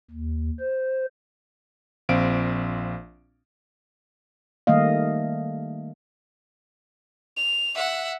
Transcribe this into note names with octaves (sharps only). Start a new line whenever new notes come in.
D#2
C5
A#1 C4 F5 D7
D#3 G3 A3 A#3 D#5 F5
F7
E5 F#5